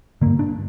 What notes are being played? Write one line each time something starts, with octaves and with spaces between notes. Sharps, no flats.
G2 D3 A#3
D4